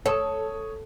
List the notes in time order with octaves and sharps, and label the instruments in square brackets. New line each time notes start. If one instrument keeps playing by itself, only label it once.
[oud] A4 [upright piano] C#5 D#6